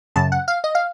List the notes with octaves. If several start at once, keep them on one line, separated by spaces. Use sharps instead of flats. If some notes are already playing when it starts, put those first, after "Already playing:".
F#2 C#3 A5
F#5
F5
D#5
F5